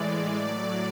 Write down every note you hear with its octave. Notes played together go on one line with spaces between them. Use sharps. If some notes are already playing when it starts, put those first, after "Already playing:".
Already playing: A2 E3 G#3 D5
A2 F#3 D5